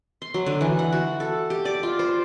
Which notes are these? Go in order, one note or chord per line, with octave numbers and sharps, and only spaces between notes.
C6
F#3
D3
E3
F#5
F#4
A4
G4
D5
F4
C5